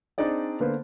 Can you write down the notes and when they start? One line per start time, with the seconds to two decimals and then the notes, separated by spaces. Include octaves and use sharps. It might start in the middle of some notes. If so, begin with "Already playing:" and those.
0.18 C4 D4 D#4 G#4 D5 D#5
0.60 D3 A#3 B3 B4 C5